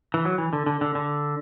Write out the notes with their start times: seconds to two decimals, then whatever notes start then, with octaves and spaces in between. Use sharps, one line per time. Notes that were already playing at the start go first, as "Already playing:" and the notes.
0.14 E3
0.25 F#3
0.38 E3
0.53 D3
0.66 D3
0.81 D3
0.95 D3